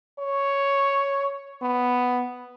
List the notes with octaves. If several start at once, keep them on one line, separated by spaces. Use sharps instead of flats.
C#5
B3